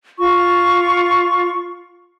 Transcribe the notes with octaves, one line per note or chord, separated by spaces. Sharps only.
F4 C#6